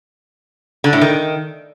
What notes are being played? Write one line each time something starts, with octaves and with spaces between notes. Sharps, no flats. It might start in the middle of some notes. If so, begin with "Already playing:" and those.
D3
A2
D#3